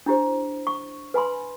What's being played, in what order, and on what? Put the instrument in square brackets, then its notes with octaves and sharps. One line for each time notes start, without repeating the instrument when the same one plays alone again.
[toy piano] D4 E4 G4 C5
C#6
B4 G#5 B5 C6